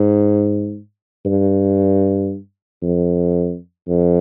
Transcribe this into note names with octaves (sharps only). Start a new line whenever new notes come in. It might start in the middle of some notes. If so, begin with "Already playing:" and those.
Already playing: G#2
G2
F2
F2